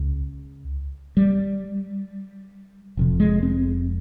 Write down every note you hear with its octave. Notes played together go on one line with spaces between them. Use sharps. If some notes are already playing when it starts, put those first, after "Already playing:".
Already playing: C#2 C#3
G3
F1 F2 C3
G#3
C4